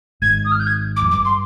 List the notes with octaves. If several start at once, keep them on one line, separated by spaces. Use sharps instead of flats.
G#1 G#2 G#6
D#6
F6
G6
G#6
D6
F2
G2 D6
C6